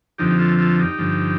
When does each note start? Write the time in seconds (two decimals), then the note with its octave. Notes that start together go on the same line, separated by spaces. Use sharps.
0.18 F2 D3 F3 D#4 G4
0.39 F4 A4
0.58 F4 A4
0.79 D#4 G4
0.98 G2 D3 F3